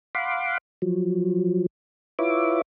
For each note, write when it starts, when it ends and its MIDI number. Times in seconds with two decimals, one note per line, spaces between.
0.15 0.58 77
0.15 0.58 78
0.15 0.58 83
0.15 0.58 84
0.15 0.58 86
0.82 1.66 53
0.82 1.66 54
2.19 2.62 64
2.19 2.62 65
2.19 2.62 71
2.19 2.62 73
2.19 2.62 76
2.19 2.62 86